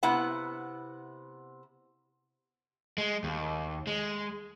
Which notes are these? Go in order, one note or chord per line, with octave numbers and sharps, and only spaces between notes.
C3 B3 E4 F#5
G#3
D#2
G#3